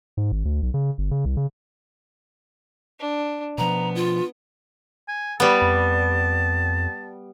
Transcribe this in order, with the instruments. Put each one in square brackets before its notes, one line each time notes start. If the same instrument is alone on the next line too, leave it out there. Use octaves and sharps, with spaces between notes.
[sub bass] G#2
G#1
D2
B1
C#3
G1
C#3
C2
C#3
[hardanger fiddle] D4
[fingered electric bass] B2 F3 [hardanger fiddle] B3 [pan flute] A#5
[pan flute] F4
[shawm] G#5
[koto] G3 B3 [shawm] A5
[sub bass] F2